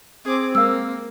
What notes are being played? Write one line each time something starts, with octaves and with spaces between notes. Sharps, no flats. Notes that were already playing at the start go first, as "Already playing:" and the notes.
C4 G#4 D6
G#3 A#3 F5 E6